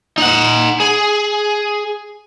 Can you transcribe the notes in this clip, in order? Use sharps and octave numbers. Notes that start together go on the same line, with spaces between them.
D#4 F#5
G#4